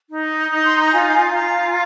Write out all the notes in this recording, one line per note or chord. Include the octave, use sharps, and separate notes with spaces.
D#4
D#4 D#6
C6
A#5
F4 G#5
F4 A#5